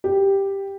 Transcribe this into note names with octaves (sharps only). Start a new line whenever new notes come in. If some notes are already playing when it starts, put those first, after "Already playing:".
G4